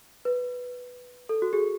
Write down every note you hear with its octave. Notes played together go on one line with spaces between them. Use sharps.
B4
A4
F#4
G#4